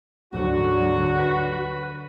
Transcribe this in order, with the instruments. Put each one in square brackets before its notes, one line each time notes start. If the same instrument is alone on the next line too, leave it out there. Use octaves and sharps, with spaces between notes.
[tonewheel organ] D2 G#2 [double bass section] D3 F#3 [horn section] F#4
[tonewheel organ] B4